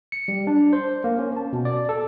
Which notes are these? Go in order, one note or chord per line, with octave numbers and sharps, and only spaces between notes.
C#7
G3
D4
C5
A#3
C#4
A5
B2
D5
A4